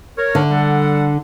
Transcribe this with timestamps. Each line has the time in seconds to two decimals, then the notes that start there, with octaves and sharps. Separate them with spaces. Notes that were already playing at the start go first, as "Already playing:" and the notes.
0.17 A#4 C#5
0.35 D3
0.51 G3 A4 F#5